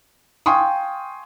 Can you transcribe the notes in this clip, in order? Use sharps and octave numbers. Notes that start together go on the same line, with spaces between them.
F5 G5 G#5 C6 C#6 D#6